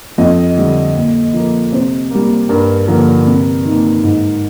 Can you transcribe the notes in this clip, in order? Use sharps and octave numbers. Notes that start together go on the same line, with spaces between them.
F2 D#5
D3 G3
A#2
F3 A#3
C3 C5
G3 A#3
G2 A#4
D3 F3 A#3 A#4
C3
D#3 A#3
G#2